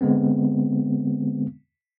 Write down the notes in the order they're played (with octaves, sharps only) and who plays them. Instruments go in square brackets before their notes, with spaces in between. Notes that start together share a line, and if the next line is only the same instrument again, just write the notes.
[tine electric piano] D3 G#3 B3 C4